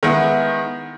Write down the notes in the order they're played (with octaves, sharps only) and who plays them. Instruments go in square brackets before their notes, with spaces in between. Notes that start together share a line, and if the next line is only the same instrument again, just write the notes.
[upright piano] D#3 G#3 B3 E4